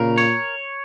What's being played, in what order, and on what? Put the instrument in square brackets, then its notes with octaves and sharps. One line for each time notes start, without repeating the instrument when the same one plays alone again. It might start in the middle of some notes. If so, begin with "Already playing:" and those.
Already playing: [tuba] A#2 [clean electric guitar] C#3 A#4
[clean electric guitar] C#5